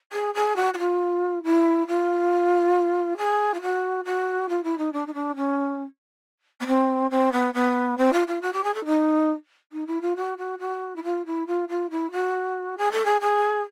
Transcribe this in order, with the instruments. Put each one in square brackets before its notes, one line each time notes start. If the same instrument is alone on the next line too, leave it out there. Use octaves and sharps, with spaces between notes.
[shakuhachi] G#4
G#4
F#4
F#4
F4
E4
F4
G#4
F4
F#4
F#4
F4
E4
D#4
D4
D#4
D4
C#4
B3
C4
C4
B3
B3
C4
F4
F4
F#4
G4
G#4
A4
D#4
D#4
E4
F4
F#4
F#4
F#4
E4
F4
E4
F4
F4
E4
F#4
G#4
A4
G#4
G#4